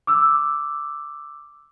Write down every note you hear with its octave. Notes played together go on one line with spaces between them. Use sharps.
D6 E6